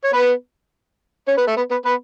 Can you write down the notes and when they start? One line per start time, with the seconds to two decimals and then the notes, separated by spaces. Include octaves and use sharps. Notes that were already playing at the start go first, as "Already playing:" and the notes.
0.04 C#5
0.13 B3 B4
1.27 C#4 C#5
1.37 B3 B4
1.47 A3 A4
1.57 B3 B4
1.70 B3 B4
1.85 B3 B4